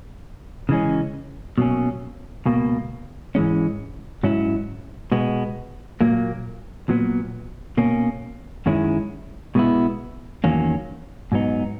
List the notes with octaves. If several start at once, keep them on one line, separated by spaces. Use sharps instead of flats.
C#3 E3 G#3 C#4
B2 F#3 A#3 C#4
C#2 B2 A#3
G#2 E3 G#3 C#4
G#2 F#3 C#4 E4
B2 G#3 B3
A#2 F#3 A#3
A#2 F#3 B3
B2 A#3 C#4
F#2 D#3 G#3 C#4 E4
B2 G#3 B3 E4
E2 D#3 F#3 A#3 C#4
G#2 F#3 B3 D#4